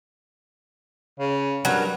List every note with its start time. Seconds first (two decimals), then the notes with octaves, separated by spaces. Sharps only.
1.19 C#3
1.65 G2 F#3 A#4